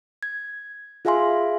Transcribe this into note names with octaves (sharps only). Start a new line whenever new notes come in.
G#6
F4 G#4 E5 F5 G#5 C6